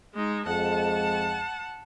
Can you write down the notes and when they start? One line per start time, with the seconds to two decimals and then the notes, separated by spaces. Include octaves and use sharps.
0.15 G#3 D#4
0.47 F2 G#3 F#5 A5